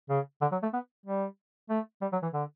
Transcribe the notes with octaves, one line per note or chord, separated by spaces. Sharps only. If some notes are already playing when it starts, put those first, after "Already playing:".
C#3
D3
F#3
A3
B3
G3
A3
G3
F#3
E3
D3